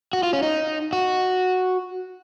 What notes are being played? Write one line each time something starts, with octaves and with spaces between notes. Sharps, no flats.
F#4
F4
C#4
D#4
F#4